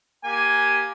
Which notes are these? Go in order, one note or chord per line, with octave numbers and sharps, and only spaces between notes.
A#3 G4 G#5